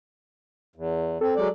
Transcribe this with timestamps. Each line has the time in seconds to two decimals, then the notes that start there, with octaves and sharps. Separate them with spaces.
0.76 E2
1.21 C4 A4
1.36 F#3 G#3 D5